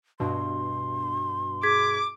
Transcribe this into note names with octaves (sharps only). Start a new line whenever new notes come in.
G2 B2 C6
G#4 D6 G#6 B6